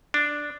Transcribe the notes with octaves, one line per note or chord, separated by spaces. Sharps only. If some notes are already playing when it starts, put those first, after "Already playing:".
D4